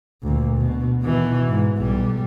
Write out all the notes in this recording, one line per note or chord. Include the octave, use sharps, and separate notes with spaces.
D2 A#2
B2
B2 E3
G#2
B1 G3